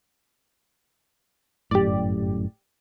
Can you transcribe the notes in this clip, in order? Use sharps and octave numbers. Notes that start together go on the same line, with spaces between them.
G1 F#2 A2 G4 D5